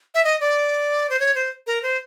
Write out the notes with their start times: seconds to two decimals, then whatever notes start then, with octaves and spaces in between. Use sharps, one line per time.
0.14 E5
0.24 D#5
0.40 D5
1.10 C5
1.20 C#5
1.35 C5
1.67 A#4
1.83 C5